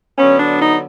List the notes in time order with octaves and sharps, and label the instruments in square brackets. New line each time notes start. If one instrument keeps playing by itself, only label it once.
[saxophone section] D3 F#3 B3 C#4
D4
D#4